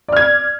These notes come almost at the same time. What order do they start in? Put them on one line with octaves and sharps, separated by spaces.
D5 F6 G#6